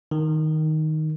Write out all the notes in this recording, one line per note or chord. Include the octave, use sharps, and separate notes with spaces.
D#3